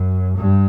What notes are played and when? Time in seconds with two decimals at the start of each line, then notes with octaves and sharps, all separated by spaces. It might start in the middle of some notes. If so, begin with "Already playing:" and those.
Already playing: F#2
0.37 G2